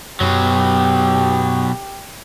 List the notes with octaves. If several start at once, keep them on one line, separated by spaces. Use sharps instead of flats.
F#2 B2 F#3 G4